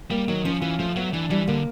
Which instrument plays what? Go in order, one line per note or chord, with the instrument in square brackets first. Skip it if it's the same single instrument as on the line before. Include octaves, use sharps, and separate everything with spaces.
[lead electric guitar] G3 [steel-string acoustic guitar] A#3
[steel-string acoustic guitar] D#3 [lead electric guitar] F#3
[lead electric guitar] F3 [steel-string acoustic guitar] C#4
[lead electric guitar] E3 [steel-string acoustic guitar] F4
[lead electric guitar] F3 [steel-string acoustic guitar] A3
[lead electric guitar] F#3 [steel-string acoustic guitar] B3
[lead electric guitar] E3 [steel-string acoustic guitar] D4
[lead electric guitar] E3 [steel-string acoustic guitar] G3
[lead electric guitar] D3 [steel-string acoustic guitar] A#3